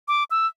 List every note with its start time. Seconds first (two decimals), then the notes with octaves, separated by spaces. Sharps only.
0.08 D6
0.31 E6